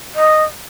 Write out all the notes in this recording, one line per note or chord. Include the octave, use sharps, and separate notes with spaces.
D#5